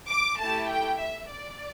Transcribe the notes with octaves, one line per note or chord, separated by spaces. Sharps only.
D6
A3 E4 G4 A5
G5
E5
D5